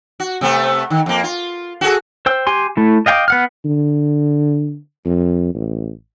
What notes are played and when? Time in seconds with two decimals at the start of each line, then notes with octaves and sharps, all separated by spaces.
0.20 F#4
0.41 C3 A3 B3
0.90 D#3
1.06 F2 A#3
1.23 F4
1.81 F#4 G#4 A4
2.26 C5 G5 E6
2.47 G4 G#5 C6
2.77 A3 E4
3.06 D#5 F5 G5 G#5 D6
3.28 B3 F#5 F6
3.65 D3
5.05 F2
5.54 A1